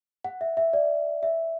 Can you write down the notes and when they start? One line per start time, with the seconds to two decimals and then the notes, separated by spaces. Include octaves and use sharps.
0.25 F#5
0.41 E5
0.57 E5
0.73 D5
1.23 E5